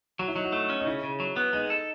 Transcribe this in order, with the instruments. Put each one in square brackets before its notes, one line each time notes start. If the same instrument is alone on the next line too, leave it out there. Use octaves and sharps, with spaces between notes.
[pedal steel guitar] F#3 [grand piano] F#4
[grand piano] E4
[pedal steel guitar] F#3 [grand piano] D#4
[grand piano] F#4
[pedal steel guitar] A3 [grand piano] E4
[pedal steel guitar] C#4
[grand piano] D#4
[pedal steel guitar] C#3 [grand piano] E4
[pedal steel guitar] C#3
F#3
B3
[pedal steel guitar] G#3 [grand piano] D#4
[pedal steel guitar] A4